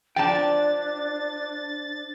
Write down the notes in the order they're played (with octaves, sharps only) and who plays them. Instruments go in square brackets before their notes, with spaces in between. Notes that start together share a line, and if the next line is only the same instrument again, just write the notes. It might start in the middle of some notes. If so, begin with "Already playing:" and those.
[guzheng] F3 D5 [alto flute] D4 [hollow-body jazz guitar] G5 A5 [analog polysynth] A6